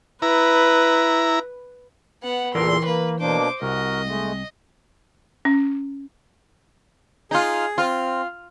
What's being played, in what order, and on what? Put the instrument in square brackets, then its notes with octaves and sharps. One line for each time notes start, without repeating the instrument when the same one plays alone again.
[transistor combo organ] E4 A#5 [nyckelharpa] B4
[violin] B3 F#5
[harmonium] E2 A#2 A4 [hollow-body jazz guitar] E3 A#4 D5 [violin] C6
[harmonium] A#3 [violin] B4
[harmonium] B2 A#3 D4 [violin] C5 D6
[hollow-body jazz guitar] C2 [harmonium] F#4 A#4 [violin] D#5
[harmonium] G#3 A3
[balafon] C#4
[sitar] D#4 F4 [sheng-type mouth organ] G#4
[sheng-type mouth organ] C4 [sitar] F4